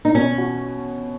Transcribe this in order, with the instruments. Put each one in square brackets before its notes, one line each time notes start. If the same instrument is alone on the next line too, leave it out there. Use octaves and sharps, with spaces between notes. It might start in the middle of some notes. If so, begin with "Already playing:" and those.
[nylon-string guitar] D#4
[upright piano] B2 [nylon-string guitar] C#4
[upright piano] F#4